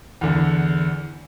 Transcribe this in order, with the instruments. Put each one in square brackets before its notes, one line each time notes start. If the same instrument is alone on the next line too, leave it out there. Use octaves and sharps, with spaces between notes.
[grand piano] E2 D3